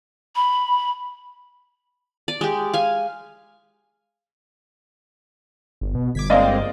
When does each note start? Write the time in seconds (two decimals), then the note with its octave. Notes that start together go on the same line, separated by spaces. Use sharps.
0.36 B5
2.28 D5
2.41 G#3 G4
2.74 F5 G#5
5.81 G1
5.95 B2
6.15 G1 D6 G#6 B6
6.30 G#3 A#3 C4 D5 D#5 F5